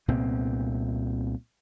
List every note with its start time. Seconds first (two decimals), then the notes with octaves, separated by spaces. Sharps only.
0.08 C2 A#2 B3 C4